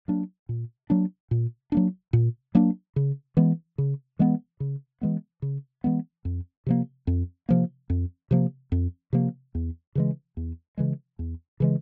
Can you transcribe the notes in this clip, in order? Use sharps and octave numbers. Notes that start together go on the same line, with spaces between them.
F#3 A#3 D4
A#2
F#3 A#3 D4
A#2
F#3 A#3 D4
A#2
F#3 A#3 D4
C#3
E3 G#3 B3
C#3
E3 G#3 B3
C#3
E3 G#3 B3
C#3
E3 G#3 B3
F2
C3 F3 A#3
F2
C3 F3 A#3
F2
C3 F3 A#3
F2
C3 F3 A#3
E2
C#3 E3 G#3
E2
C#3 E3 G#3
E2
C#3 E3 G#3